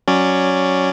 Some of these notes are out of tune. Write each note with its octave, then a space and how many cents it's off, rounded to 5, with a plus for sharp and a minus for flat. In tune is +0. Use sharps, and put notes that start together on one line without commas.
F#3 +0 C#4 +0 D5 +0